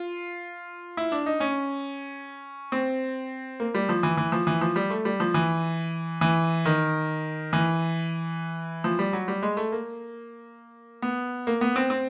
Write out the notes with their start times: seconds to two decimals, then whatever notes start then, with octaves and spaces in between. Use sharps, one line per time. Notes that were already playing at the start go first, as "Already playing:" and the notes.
Already playing: F4
0.97 E4
1.12 D4
1.26 D#4
1.40 C#4
2.72 C4
3.60 A#3
3.75 G3
3.89 F3
4.03 E3
4.17 E3
4.32 F3
4.47 E3
4.61 F3
4.76 G3
4.90 A3
5.05 G3
5.20 F3
5.34 E3
6.21 E3
6.65 D#3
7.53 E3
8.84 F3
8.99 G3
9.13 F#3
9.28 G3
9.43 G#3
9.57 A3
9.72 A#3
11.02 B3
11.47 A#3
11.61 B3
11.76 C4
11.90 C4